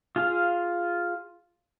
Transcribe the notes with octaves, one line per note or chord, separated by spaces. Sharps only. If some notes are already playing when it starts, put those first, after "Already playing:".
F4 G#4 F5